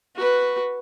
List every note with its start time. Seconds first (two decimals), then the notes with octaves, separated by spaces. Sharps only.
0.16 F#4 B4